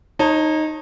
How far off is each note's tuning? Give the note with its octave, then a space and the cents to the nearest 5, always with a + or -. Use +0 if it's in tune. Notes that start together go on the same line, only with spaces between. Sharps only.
D#4 +0 C#5 -35 A5 +20